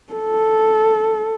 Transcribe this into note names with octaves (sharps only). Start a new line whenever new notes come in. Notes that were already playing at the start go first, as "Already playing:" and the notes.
A4